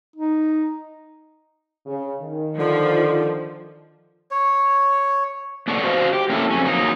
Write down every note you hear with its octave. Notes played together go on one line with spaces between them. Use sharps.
D#4
C#3
D#3
D3 F3
C#5
B3 D4 A4 C#5 D5 F#5
F#4 C5 D#5 F5
G4
A#3 C#4 E4 A4
F2 C#4
F#3 A#3 D#4